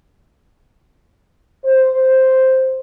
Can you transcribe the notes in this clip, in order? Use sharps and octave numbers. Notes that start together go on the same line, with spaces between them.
C5